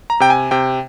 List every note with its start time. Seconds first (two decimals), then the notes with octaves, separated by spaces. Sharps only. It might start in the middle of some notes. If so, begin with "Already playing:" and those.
0.10 A#5
0.20 C3 G5
0.30 G#5
0.51 C3 G5